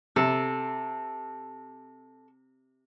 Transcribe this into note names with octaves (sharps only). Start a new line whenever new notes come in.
C3 A4